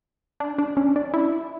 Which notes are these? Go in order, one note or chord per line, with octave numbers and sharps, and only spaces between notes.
D4
D4
C#4
D4
E4